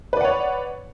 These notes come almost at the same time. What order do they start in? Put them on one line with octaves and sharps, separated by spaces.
B4 D5 F#5 C#5